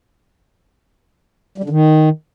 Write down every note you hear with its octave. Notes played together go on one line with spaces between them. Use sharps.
G3
D3
D#3